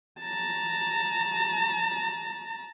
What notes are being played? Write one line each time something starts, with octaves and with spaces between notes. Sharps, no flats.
A5 A#5